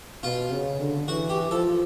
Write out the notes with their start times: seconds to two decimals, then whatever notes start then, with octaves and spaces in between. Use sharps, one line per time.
0.23 B2 F4
0.52 C#3
0.80 D3
1.08 E3 F#4
1.29 G4
1.51 F3 A4